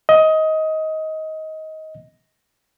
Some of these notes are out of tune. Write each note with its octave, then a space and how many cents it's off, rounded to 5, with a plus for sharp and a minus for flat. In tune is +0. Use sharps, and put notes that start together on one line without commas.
D#5 +20